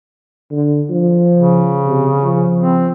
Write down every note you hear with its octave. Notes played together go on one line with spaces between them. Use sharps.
D3
F3
C#3
C3
F3
C4